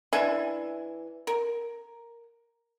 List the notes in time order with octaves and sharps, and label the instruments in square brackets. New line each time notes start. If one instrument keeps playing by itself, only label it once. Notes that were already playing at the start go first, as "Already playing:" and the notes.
[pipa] E3 D4 E5 G#5
A#4